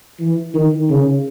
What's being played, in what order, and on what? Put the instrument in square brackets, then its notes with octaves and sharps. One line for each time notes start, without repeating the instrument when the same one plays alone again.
[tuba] E3
D#3
C#3